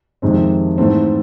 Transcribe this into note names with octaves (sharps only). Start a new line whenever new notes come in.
F2 C3 D#3 G#3 C4
G#2 E3 A3 C4